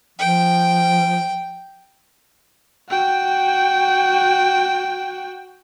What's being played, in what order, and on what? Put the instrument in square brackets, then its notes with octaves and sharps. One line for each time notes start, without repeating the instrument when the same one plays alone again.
[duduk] F3 [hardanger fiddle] G5
[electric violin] F#4 G5